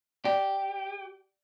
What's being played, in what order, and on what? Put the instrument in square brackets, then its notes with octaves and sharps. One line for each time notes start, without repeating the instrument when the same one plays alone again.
[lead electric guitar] G4 [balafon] D5